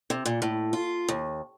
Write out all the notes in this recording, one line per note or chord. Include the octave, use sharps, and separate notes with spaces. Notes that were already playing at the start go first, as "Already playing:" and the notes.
C3
A#2
A2
F4
D#2